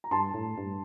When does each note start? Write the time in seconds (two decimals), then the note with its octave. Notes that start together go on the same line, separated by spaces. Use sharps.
0.04 A#5
0.11 G2 A5 C6
0.34 A2
0.58 G2